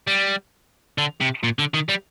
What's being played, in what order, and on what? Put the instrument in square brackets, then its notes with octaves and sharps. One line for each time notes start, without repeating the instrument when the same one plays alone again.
[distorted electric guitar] G3
D3
C3
A#2
D3
D#3
G3